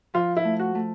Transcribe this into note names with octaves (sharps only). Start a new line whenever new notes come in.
F3 F4
E4
A3
F#4
A3